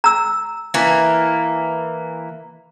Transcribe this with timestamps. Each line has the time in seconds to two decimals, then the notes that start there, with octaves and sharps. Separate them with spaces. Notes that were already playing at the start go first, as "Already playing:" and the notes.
0.04 A#5 E6
0.74 E3 A#3